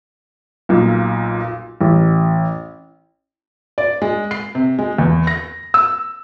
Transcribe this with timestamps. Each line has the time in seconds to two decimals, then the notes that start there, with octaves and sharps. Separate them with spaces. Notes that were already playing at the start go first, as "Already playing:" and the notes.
0.69 B1 A#2
1.81 A1
3.78 D5
4.02 G#3
4.31 C7
4.55 C3
4.79 G#3
4.98 E2
5.27 A#6
5.74 E6